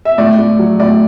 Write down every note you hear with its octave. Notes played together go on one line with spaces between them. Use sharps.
E5
A2 D5
A2
F#3
A2 D5